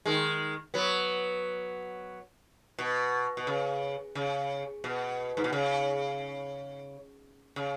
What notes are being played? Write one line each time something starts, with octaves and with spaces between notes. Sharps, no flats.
D#3 G#3
F#3 B3
B2
B2
C#3
C#3
B2
G#2
B2
C#3
C#3